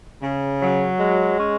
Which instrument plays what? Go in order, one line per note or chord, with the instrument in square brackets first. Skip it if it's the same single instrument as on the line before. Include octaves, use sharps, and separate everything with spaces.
[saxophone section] C#3
F#3
G#3
C#4